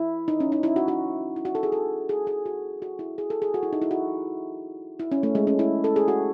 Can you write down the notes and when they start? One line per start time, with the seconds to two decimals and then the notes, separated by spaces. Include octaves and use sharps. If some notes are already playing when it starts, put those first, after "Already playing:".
Already playing: E4
0.28 D#4
0.40 C#4
0.52 D#4
0.63 E4
0.76 F#4
0.88 F#4
1.36 E4
1.45 F#4
1.55 A4
1.63 G#4
1.72 A4
2.09 G#4
2.27 G#4
2.46 F#4
2.82 F#4
2.99 E4
3.18 G#4
3.30 A4
3.42 G#4
3.54 F#4
3.63 E4
3.73 D#4
3.82 E4
3.91 F#4
4.99 E4
5.12 C#4
5.23 A3
5.35 G#3
5.47 C#4
5.59 E4
5.84 A4
5.96 G#4
6.08 F#4